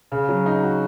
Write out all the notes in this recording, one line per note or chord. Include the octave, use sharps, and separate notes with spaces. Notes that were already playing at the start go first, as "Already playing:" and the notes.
C#3
F#3
D#4
F#4